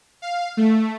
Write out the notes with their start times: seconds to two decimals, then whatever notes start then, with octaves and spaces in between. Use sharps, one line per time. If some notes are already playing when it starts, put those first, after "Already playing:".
0.22 F5
0.57 A3